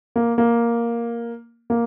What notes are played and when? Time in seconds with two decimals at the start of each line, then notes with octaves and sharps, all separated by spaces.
0.16 A#3
0.38 A#3
1.70 A#3